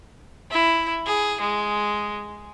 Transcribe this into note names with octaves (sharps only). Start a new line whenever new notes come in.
E4
G#4
G#3